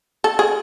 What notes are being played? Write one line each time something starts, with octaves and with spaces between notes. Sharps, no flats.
A4
G#4